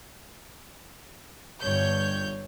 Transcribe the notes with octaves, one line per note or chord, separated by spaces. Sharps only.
G1 G2 C#5 G6